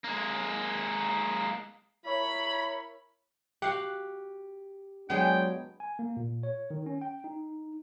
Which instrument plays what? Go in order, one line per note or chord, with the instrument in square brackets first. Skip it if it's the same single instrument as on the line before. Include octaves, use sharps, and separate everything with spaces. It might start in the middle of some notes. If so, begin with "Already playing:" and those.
[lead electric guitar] G#3 A#3
[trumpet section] E4 A#4 C#5 [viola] B5
[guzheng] F#4 F5 F#5 [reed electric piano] G4
[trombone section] F#3 G#3 D4 [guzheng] B3 G#4 [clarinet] G5
[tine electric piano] G#5
A#3
A#2
C#5
D#3
C#4
G5
D#4